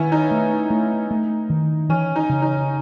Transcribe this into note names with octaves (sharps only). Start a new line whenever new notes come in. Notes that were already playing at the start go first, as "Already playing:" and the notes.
Already playing: D#3 B3 C#4 E4
D#4
A3
A3
A3
D#3
E3 C#4
D#4
C#3
D#4